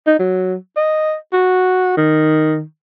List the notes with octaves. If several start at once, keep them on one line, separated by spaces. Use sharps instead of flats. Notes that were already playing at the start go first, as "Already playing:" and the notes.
D#4
F#3
D#5
F#4
D#3